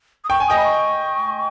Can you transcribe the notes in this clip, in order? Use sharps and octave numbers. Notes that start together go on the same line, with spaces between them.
D#6
G5 C#6
G#5
D#5 G5 D#6
B5
C#6